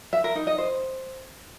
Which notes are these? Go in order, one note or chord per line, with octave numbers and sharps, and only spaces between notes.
E5
A#4
D#4
D#5
C5